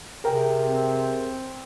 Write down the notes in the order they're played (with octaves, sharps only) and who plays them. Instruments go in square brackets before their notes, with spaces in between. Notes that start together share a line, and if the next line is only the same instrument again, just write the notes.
[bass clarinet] C3 [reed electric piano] G#4 A#4 G5
[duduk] C4